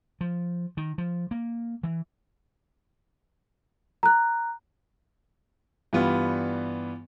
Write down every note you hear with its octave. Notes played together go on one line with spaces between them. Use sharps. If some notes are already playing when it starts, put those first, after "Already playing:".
F3
D#3
F3
A#3
E3
A#5 F#6
G2 E3 G3 B3 F4